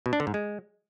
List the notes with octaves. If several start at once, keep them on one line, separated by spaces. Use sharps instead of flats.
B2
D4
D3
G#2
G#3